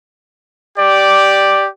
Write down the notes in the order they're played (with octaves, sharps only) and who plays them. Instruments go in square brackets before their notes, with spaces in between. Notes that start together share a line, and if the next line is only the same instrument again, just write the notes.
[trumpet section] G4 D5